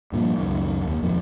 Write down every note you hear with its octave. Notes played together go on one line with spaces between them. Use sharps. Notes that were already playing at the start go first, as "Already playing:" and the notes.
G2 A#2 D#3 F3
C#2 F#2 D#3
D#2
F2 G#2 B2 D#3